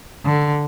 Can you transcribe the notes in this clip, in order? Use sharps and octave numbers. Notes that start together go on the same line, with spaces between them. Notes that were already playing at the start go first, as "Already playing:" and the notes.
D3